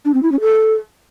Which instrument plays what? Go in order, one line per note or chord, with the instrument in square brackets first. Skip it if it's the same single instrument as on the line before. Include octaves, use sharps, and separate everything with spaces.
[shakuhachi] D4
C4
E4
C#4
A4